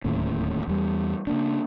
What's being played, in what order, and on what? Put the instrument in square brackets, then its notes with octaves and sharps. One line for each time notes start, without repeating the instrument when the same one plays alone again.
[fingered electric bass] D1 D#2 A2 C#4
E2 G3
C#3 A#3 D4